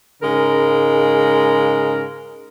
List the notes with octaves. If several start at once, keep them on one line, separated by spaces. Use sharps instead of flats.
G#2 C#3 G#3 A#4